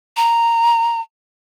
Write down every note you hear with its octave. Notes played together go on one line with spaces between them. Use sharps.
A#5